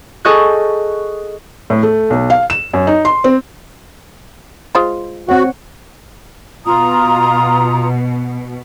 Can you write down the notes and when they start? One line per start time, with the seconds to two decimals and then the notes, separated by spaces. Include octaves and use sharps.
0.25 G#4 A4 D#5 C#6 F#6 G6
1.70 A2
1.83 A3
2.10 B1
2.30 F5
2.50 E7
2.73 F#2
2.87 D#4
3.05 C6
3.24 C4
4.75 G#3 F4 C5
5.29 C4 F#4 C#5 F#5
6.65 B2 F4 A#5 D#6